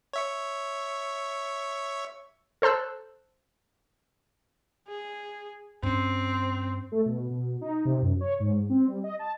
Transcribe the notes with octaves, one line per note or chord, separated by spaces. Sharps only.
C#5 E5 C#6
A4 C5 A5 E6 F#6
G#4
G2 C4 C#4
A3
B2
B2
D#4
C3
F#2
C#5
G#2
C4
G3
D#5
A5